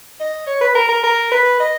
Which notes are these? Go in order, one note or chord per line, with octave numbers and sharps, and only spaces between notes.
D#5
C#5
B4
A#4
A#4
A#4
B4
D#5